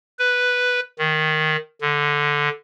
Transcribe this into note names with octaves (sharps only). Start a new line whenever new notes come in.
B4
D#3
D3